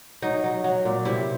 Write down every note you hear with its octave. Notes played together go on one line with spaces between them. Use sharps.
F#3 D#4
F#3
F#3
A#2
C3 E4